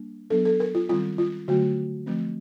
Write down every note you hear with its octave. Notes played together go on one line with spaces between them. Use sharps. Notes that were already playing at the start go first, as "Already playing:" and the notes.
Already playing: G3 A#3 D4
F#3 B3 D4 A4
A4
A#4
F4
D#3 G3 C4 F4
F4
D3 F#3 A3 F#4
F3 A3 C4